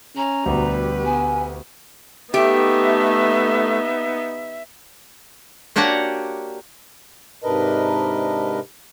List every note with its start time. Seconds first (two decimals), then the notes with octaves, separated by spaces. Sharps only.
0.16 C#4 A#5
0.46 D2 B2 G3 G4 B4
1.05 B3 G#5
2.34 A3 B3 D#4 G4 E5
5.76 A#3 D4 F#4 G4 C#5 F#5
7.43 G#2 C3 D4 A#4 B4 D#5